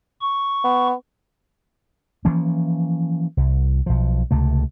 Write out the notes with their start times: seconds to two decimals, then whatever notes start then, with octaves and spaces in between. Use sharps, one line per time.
0.21 C#6
0.64 B3
2.25 E3 F3 A#3 C#4
3.37 C2
3.86 B1 F3
4.31 C#2 C3 A3